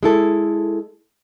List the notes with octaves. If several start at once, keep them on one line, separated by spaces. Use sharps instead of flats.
G#3 E4 A4